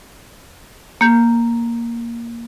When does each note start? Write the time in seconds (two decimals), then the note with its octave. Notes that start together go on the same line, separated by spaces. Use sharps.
1.01 A#3 G6